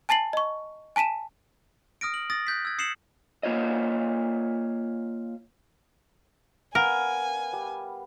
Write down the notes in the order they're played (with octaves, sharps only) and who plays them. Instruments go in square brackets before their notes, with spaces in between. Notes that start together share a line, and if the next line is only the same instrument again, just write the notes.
[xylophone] G#5 A5 A6 C7 F#7
D#5 C#6
G#5 A5 B6 D#7 E7
[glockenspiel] D#6 F6 A#6 D7
F#7
D#6 A6 A#6
F#6 G6 B6
E6 G#6
D#6 C7 C#7 E7 F#7
[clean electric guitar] A#3 F4 C#5 D#5
[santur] B3 F5 [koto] A#4 [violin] G#5
[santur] G3